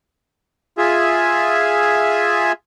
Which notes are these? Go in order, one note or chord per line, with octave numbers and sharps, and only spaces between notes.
F4 G#4 E5